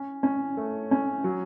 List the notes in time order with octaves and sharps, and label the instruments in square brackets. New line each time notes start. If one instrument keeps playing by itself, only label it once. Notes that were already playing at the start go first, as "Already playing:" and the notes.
Already playing: [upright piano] C#4
C#4
A3
C#4
F#3